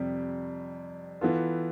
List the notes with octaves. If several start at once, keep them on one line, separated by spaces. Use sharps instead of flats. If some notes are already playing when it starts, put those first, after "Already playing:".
Already playing: F2 C3 G3
E3 B3 F4 A4